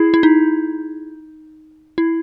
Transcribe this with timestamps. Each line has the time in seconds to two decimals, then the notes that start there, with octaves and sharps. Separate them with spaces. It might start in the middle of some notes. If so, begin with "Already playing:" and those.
Already playing: E4 G#4
0.14 E4
0.23 D#4
1.98 E4